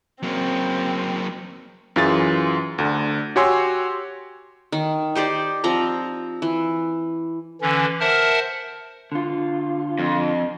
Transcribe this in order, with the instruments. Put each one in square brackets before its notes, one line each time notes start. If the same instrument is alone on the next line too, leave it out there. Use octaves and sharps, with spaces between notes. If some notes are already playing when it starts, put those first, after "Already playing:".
[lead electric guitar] F#3 A#3 [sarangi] C4
[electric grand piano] F#2 E3 F4 G#4 A6
D2 D3
F#4 G4 C#5 G#5 C6 E6
[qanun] D#3
D#4 G4 C5 D5
F3 C4 A#5
E3
[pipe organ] D3 E3 C#4
A#4 C5 E5 F#5 A5 F6
[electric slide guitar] D3 F4
[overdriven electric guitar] F2